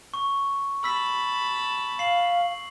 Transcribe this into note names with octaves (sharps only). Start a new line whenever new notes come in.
C#6
A5 B5 E6 B6
F5 C7 F#7